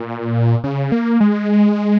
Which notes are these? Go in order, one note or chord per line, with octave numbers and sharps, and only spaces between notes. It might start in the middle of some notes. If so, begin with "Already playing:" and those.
Already playing: A#2
C#3
A#3
G#3